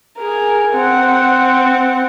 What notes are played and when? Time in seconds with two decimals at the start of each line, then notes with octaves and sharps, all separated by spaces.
0.18 G#4 A#4
0.74 C4 F#5